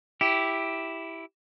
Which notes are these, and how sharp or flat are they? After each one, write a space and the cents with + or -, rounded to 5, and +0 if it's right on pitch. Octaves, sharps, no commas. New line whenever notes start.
E4 +0 G4 +0